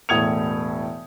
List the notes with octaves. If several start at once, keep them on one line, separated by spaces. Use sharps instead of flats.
E1 A2 D#6 G#6 C#7 F7